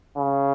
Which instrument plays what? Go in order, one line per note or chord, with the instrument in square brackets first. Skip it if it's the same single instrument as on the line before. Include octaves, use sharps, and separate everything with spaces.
[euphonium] C#3